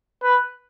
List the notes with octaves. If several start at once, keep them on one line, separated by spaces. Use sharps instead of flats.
B4